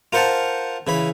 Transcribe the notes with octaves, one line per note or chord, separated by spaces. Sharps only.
F4 A#4 C5 F#5 A5
C#3 E3 B5